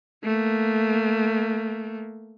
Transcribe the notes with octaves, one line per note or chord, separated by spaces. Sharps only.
A3 A#3